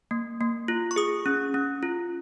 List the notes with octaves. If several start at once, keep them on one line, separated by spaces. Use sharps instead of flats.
A#3
A#3
F4
C#6
G#4 D#6
C#4
C#4
F4